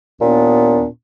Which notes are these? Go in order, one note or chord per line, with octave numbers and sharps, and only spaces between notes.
D#2 A#2 B3 D4